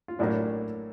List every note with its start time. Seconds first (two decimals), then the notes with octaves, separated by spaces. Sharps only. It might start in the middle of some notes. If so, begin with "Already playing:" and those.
0.08 F4
0.19 A1 A2 F#3 A#3 D4 E4